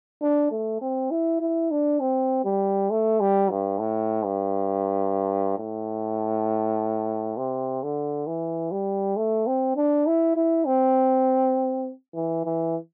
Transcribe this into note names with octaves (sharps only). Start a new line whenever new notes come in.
D4
A3
C4
E4
E4
D4
C4
G3
A3
G3
G2
A2
G2
A2
C3
D3
E3
G3
A3
C4
D4
E4
E4
C4
E3
E3